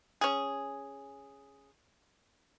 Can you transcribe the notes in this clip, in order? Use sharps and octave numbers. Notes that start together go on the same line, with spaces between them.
C#4 G#4